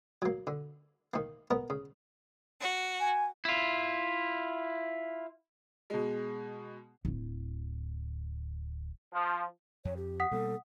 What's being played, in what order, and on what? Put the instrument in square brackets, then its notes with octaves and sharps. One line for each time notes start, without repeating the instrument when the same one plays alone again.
[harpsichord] F#3 A#3
D3
D#3 A#3
B3 A#4 D#5
C#3
[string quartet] F#4
[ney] G#5
[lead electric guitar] E4 F4
[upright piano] B2 G#3
[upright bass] D1 E4
[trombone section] F3
[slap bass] F2 [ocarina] C#5
[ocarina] G4
[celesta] F#5 D#6 B6
[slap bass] B2 G3 A#3 [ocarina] A4